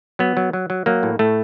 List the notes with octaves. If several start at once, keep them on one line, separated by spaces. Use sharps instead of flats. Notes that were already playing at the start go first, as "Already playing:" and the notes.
F#3 B3
F#3
F#3
F#3
F#3 A#3
A2
A2 A3